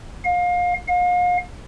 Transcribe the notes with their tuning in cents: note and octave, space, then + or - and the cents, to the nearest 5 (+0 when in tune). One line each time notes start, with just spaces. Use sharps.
F5 +30
F5 +40